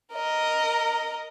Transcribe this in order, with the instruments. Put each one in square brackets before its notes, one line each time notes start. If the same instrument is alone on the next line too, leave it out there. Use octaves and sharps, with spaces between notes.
[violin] A#4 D#5